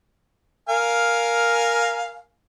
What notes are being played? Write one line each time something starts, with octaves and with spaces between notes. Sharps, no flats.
A#4 F5 G#5